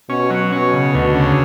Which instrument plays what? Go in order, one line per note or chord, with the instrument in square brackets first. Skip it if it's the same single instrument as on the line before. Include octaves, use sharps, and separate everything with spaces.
[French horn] B2 [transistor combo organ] C#4
[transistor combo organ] F#3
[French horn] B2 [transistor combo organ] C#4
[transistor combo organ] C#3
[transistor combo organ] D2 [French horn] B2
[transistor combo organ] C#3